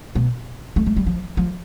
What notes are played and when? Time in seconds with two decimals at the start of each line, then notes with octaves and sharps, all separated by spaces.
0.15 B2
0.76 A3
0.86 A3
0.96 G3
1.06 F3
1.37 F3